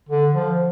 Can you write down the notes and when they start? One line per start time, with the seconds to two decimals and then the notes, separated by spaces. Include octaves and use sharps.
0.09 D3
0.33 F3